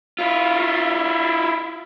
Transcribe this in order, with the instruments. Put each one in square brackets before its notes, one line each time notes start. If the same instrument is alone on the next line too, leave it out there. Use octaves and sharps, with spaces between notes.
[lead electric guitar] E4 F4